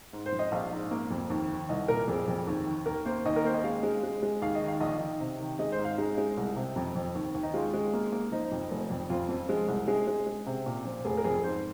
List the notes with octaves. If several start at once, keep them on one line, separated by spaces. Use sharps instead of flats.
G#2
C5
F3
D#5
A#1 F5
G#2
A#3
F2
D#2
D#3
C2 D#5
A#2 A#4
F2 G#4
F2
D#2
D#3
D#2 A#4
A#3 C5
D#2 D#5
A#4
A#3 C5
D#5
G#3 F5
G#3
G#3
G#3
D#2 F5
D#5
D#3
F5
A#1 D#5
D#3
C3
D#3
G#3 D#5
C5
G#2
F5
G#3 D#4
G#3
C2
C3
F2
F2
D#2
D#2
D#4
G#3 F4
G#3
A#3
A#3
F3 D#4
F2
F1
F2
F2 F4
F2
G#3
C2
G#3 G#4
G#3
G#3
C3
A#2
F3
F1 G#4
A#4
F2 G#4
G#2 C5